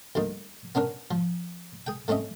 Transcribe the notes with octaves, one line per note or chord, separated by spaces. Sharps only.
D2 G2 A#3 D#4
B3 C#4 D4 A#4
F3
G#4 G5
A3 C4 C#4 D#5 E5